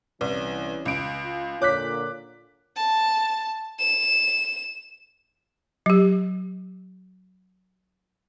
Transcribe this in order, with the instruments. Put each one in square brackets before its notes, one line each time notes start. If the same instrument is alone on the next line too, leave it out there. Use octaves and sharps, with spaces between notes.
[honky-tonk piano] C2 [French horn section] E3 C#4 [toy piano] B4
[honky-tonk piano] C#2 D7
[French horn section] F4
[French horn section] A#2 D3 [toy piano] C#5 [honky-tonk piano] D6 F#6 B6
[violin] A5
E7
[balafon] F#3 G4